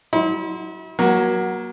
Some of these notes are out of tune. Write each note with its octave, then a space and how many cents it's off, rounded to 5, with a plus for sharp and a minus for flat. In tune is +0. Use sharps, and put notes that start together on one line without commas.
F#3 +0 E4 -40 C6 +0
F#3 +0 A#3 +25 F#4 +5